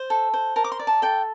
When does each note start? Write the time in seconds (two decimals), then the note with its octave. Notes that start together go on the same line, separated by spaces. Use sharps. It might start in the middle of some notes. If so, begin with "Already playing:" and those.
Already playing: C5
0.10 A4
0.34 C5
0.56 A#4 A5
0.64 D6
0.72 C6
0.80 D5
0.87 A5
1.02 A4 G5